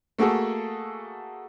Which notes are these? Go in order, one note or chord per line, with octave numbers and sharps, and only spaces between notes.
A3 A#3 F#4 G#4 A4